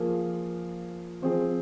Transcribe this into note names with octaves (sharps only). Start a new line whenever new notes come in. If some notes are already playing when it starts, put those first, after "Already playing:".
Already playing: F3 A#3 F4 G#4
F3 C4 G#4